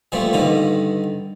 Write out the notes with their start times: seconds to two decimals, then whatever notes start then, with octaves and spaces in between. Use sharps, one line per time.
0.12 A#2 F3 G3 A3 B3 C4
0.33 G2 D3 D#3 B3